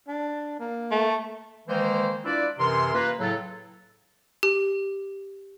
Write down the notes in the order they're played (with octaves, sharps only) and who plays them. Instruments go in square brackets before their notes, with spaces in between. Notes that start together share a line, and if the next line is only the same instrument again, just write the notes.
[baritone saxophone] D4
A#3
[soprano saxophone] A3
[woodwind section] D#3 E3 G#3 A#3 C5
D4 E4 F4 B4 D5
F#2 C3 E3 A#4 C6
A#3 F4 B4
A2 C#3 F#3 A4
[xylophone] G4